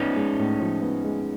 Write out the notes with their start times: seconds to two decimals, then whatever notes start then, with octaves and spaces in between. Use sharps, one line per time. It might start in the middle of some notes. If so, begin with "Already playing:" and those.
Already playing: A2 F3 G#3 B3 C#4 D#4
0.16 G#3
0.38 A2
0.60 F3
0.82 B3
1.04 G#3